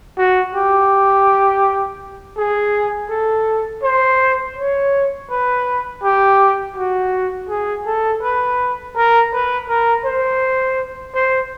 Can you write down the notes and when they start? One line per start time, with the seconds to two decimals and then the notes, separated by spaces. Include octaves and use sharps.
0.18 F#4
0.55 G4
2.37 G#4
3.10 A4
3.83 C5
4.56 C#5
5.30 B4
6.03 G4
6.76 F#4
7.49 G#4
7.86 A4
8.22 B4
8.96 A#4
9.32 B4
9.68 A#4
10.05 C5
11.15 C5